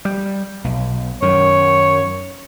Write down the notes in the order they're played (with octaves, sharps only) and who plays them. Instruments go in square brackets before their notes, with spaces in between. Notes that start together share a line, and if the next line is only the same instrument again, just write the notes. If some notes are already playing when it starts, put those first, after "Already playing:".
[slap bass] G3
B1
[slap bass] F#2 D#3 [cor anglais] C#5